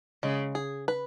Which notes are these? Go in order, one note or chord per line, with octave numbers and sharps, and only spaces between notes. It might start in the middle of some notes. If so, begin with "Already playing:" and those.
C#3 G#3
G#4
B4